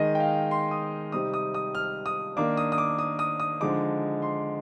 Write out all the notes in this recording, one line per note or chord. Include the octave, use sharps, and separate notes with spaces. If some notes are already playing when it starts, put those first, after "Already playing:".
Already playing: D#3 G#3 D#4 D#5
G5
F5
C6
D#6
C3 G3 C4 D#4 D#6
D#6
D#6
F6
D#6
D#3 A#3 D4 D6
D#6
D#6
D6
D#6
D#6
D#6
D3 F3 G#3 D#4 D6
C6